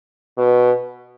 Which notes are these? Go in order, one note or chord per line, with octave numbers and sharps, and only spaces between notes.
B2